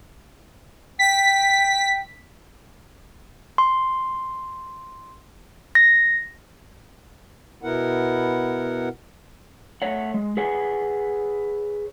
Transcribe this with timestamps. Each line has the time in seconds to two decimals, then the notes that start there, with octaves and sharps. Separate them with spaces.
0.99 G5 B6
3.58 C6
5.75 A#6
7.63 B2 B3 E4 A#4 F#5
9.82 A3 C#5 F#5
10.14 G#3
10.37 G#4 B4 C#5 F#5 G#5